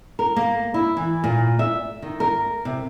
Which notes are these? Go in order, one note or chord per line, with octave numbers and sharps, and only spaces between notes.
A#4
A#3
E4
E3
A#2
E5
D#3
A#4
C3